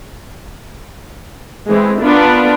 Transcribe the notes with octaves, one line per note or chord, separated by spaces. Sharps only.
E3 G#3 C4
B3 D4 F4 A#4 B4